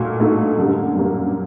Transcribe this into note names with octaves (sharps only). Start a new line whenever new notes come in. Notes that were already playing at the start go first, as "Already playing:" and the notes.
Already playing: A#2 A3 D#4 F#4
A#2 A3 D#4 F#4
F#2 D3 G3 A#3
F#2 D3 G3 A#3